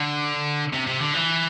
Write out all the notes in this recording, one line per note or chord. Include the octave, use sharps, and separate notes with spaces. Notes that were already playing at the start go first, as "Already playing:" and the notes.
Already playing: D3
C3
C3
D3
E3